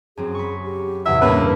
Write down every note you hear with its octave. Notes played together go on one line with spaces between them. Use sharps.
F#2 F#3 C4 G#4
B5 C#6
G4
E2 A2 C3 E5 F#5
G2 C#3 A#3 B4 C#5